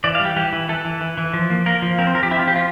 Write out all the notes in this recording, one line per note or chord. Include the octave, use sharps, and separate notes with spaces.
E3 D5
F5
G3
G4
E3 G4
E3
E3 A4
E3
E3
E3
F3
A#3
A#3 A#4
F3
C4 A#4
C5
F3 A#4
G4
C4 E4
F4
F3 G4
F4